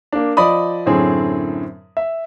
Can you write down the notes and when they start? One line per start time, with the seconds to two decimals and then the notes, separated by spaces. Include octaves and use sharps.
0.12 A#3 D4
0.37 F3 D5 D#5 B5 D#6
0.86 F#2 A2 D3 C4 G#4 C#5
1.97 E5